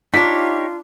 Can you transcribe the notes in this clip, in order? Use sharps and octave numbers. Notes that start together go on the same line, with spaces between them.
A#3 D4 D#4 F4 G4 C#5 B6